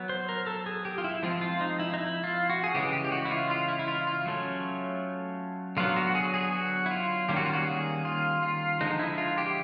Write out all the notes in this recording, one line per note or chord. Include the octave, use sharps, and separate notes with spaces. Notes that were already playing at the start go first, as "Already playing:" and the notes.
Already playing: F#3 B3
C5
A#4
A4
G#4
G4
F4
E4
F3 G#3 C4 F4
F4
D#4
E4
D#4
E4
F4
F#4
G#4
C#3 E3 G#3 G4
G4
G4
F#4
E4
F4
F4
E4
E4
F4
F4
F#3 A3 C#4
D3 F#3 B3 F4
F#4
G#4
G#4
F#4
E4
F4
D#3 G3 A#3 C#4 G4
F#4
F4
F#4
G#4
F4
F4
D3 F3 G#3 D#4
E4
F4
G4